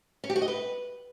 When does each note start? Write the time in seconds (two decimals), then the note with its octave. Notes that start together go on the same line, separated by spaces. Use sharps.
0.24 C#4
0.30 G4
0.36 F#4
0.42 D#5
0.48 B4